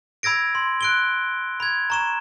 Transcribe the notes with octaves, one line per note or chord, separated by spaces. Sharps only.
B5 E6 G#6 A#6 D7
C6
F#6 D7 G7
B5 G#6
A#5 C#6 E7